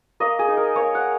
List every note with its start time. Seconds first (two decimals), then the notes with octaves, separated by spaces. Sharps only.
0.20 A#3 D#5
0.39 G#4
0.48 D#4
0.57 A#4
0.76 A#3 C#5
0.95 F#5